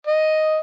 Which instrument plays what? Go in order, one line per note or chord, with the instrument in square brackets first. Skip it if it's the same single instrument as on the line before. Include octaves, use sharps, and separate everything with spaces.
[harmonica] D#5